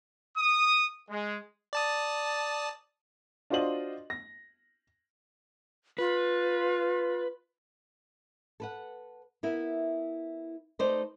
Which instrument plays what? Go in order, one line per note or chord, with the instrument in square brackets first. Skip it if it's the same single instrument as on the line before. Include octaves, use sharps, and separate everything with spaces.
[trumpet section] D#6
G#3
[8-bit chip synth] D5 A5 D#6
[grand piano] D4 F4 F#4 C5 D#5 F#7
A#6
[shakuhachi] F4 [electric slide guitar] B4
[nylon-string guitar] A4 B4 F#5
B3 E4 A#4 E5
A3 D#4 B4 C5 D5 D#5